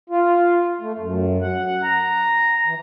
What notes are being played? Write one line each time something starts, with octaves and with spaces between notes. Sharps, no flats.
F4
A3
F#2
F#5
A#5
E3